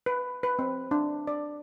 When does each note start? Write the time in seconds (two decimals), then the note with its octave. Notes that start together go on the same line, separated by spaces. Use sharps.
0.06 B4
0.43 B4
0.59 C4
0.91 D4
1.27 D5